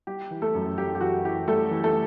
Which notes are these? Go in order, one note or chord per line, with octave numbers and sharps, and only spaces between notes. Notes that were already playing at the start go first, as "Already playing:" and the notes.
G3 G4
E3
A3 A4
F#2
F#2 G4
G4
E3 F#4
E3 G4
G3 A3 A4
E3
A3 A4